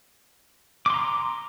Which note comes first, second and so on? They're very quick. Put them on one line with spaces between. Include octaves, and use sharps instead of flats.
D6 C6 A#5